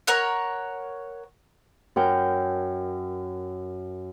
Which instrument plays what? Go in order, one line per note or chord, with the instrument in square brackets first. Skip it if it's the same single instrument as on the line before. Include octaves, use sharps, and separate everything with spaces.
[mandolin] A#4 C#5 F#5
[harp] F#2 A#4 F#5 G5